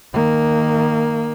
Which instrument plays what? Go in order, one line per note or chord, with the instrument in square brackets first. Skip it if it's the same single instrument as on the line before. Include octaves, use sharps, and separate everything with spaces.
[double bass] D#3 A#3